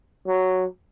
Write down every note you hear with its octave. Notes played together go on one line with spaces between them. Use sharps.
F#3